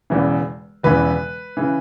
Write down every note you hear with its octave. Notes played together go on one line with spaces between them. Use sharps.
E1 E2 C#3 E3
E1 E2 C#3 E3 B4
C#3 E3